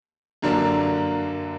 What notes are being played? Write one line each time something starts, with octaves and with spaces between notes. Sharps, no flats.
F#2 D3 F#3 A#3 D4